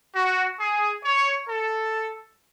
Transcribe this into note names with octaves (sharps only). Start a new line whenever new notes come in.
F#4
G#4
C#5
A4